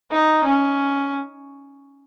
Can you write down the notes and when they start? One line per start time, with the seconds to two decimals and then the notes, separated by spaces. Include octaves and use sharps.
0.11 D#4
0.44 C#4